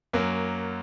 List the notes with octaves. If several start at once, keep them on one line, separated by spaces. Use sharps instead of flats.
F#2 F#3 A#3